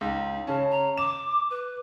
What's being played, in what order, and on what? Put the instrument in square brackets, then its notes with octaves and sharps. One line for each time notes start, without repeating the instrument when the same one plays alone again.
[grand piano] C#2 [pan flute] D#4
[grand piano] C#3 C#4 [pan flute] A5
[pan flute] A#5
[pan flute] D6 [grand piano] E7
[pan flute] B4